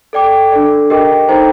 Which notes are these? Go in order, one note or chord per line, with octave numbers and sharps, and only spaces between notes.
A4 D5 G5 D6
D4 A4 D5
G4 A#4 D#5 G5 D6
D#4 A4 C5 G5 A#5